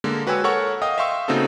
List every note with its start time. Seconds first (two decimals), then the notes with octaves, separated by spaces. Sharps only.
0.04 D3 G#3 A#3
0.27 F#4 B4 C#5 G5 G#5 E6
0.44 A4 A#4 C#5 F#5 C#6
0.82 D#5 F5 G5 D#6
0.98 E5 F5 G5 C6 C#6 E6
1.28 C#3 A#3 C4 D#4 F#4 A4